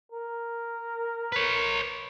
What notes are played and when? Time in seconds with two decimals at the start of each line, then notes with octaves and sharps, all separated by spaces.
0.12 A#4
1.32 B4 C#5